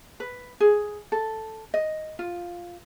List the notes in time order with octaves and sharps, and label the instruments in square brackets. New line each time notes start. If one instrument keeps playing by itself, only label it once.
[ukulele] B4
G#4
A4
D#5
F4